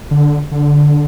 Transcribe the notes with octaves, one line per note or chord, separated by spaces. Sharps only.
D3
D3